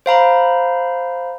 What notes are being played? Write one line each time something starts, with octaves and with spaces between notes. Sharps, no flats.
C5 F5 A#5 B5